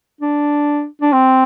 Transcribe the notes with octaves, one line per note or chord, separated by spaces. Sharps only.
D4
D4
C4